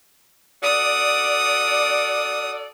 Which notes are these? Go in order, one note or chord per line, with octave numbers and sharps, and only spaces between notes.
F#4 A4 D5 D#6